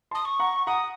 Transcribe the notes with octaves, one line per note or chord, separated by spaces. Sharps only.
A5 C6 D#6
C#6
F#5 A#5
F#5 A#5 D#6